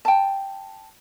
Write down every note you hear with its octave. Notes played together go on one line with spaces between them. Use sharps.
G5 A5